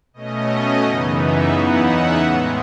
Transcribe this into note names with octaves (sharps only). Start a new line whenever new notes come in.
B2 A3 C#4 D#5
F#2 C#3 E3 B3 D#4
E5
E2 C#3 E3 B3 D#4 F#5
E5
A2 G#3 B3